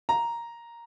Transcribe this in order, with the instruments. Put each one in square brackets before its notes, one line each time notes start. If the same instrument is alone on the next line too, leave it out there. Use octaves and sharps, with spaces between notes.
[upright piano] A#5